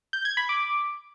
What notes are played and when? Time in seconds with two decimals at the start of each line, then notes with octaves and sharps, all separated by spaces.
0.13 G6
0.25 G#6
0.37 B5
0.49 D6